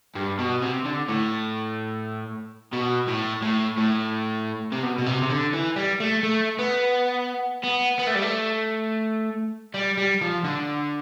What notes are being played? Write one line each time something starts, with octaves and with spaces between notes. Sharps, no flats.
G2
B2
C3
D3
A2
B2
A2
A2
A2
C3
B2
B2
C3
C3
D3
E3
G3
A3
A3
B3
B3
B3
A3
G3
A3
G3
G3
F3
D3